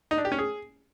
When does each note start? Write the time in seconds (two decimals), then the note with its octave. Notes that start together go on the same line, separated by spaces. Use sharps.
0.11 D#4
0.18 D4
0.25 G4
0.32 C#4
0.39 G#4